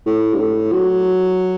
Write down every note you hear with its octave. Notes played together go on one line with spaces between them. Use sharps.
A2
G2
A2
F#3